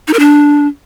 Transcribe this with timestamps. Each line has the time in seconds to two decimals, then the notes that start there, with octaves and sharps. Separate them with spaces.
0.08 D#4
0.14 A#4
0.19 D4